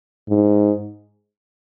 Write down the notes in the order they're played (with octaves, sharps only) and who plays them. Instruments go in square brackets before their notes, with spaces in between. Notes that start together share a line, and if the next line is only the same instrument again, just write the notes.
[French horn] G#2